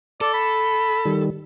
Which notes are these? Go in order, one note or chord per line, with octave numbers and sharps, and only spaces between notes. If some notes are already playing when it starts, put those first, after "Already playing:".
A4 D5
B5
D#3 G3